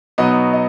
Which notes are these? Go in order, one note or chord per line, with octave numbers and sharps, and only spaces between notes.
B2 F#3 B3 D#4 D#5
D#5